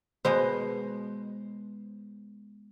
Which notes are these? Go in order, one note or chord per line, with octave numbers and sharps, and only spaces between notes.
B2 G#3 B3 C5